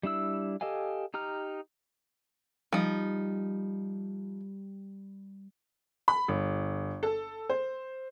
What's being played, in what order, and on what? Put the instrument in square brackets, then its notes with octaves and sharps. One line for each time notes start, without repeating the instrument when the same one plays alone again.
[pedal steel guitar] G3 D4 E4 E6
G4 A4 D#5 F5 G#5
D#4 G4 A#5 F6
[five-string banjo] F3 D#4 [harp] G3
[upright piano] B5
G1
A4
C5